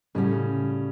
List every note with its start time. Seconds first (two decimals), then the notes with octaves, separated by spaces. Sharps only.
0.15 A2 C#3 G3 C#4 F#4
0.33 C#3